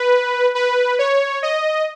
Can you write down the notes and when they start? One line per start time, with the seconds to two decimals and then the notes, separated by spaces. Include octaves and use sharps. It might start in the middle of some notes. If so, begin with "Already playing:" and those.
Already playing: B4
0.55 B4
0.99 C#5
1.43 D#5